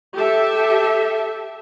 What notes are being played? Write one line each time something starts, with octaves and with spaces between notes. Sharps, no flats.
G4 A4 E5